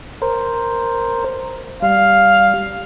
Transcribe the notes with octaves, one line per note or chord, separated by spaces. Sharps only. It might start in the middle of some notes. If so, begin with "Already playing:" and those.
A#4 C5
G3 F5